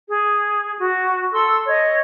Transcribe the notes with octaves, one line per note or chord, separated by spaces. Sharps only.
G#4
F#4
A4 C6 E6
C#5 D#5